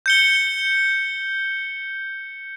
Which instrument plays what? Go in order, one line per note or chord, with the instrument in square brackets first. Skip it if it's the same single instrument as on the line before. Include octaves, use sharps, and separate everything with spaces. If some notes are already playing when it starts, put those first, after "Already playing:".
[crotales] G6 C#7 G7